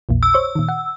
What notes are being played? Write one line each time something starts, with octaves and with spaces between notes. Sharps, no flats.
A#1 E2 A#2
E6
C5 C#5 C#6
A#2 D#3
F#5